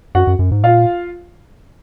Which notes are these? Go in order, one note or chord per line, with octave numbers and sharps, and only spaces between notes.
F#2 F#4 F#5
F#2
F#2
G#2
A#2 F4 F5